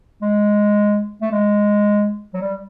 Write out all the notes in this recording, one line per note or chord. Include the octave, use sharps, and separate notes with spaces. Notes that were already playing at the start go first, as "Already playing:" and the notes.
G#3
A3
G#3
F#3
G3